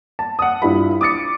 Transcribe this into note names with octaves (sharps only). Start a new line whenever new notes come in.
A5
F#5 D#6
G2 E4 F4 B5
D6 D#6 A6 C#7